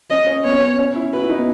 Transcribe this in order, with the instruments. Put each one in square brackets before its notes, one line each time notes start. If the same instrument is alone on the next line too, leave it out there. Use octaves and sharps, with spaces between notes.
[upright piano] C#4 [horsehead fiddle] D#5
[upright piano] C#4
[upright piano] B3 [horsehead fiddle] C#5
[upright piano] C#4
B3
C#4
E4
[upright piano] F#4 [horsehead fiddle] B4
[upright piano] E4
D#4
B3